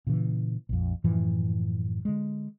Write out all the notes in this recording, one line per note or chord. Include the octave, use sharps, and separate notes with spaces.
A#2 C#3 E3
A#1 F2
F#2 A2 E3 F3
D3 G#3